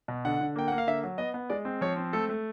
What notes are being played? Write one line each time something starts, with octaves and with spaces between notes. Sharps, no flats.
B2
D3 F#5
D3
A#3 G5
A#3 F#5
F5
D3 E5
F#3
B3 D#5
B3
G#3 D5
C4
F3 C#5
C4
A3 A4
A3